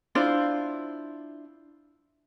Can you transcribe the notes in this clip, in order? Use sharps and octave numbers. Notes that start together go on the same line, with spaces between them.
D4 E4 F4 C5